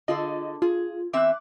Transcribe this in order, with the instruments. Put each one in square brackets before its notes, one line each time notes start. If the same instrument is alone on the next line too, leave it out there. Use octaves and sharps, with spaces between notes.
[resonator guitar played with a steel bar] D3 G#4 A4 [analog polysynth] F4 D#5
[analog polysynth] F4 [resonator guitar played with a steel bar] G#4
[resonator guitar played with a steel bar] E2 C4 E5 [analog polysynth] D6 F#6